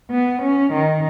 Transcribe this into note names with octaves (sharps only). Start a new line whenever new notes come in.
B3
C#4
D#3